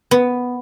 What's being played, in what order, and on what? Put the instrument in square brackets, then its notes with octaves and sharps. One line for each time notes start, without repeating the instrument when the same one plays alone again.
[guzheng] B3